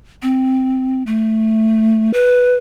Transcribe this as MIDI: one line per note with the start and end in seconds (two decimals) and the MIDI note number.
0.22 1.03 60
1.07 2.12 57
2.14 2.56 71